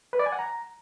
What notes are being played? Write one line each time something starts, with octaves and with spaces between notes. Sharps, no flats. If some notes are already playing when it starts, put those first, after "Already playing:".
B4
D5
G#5
F#5
A#5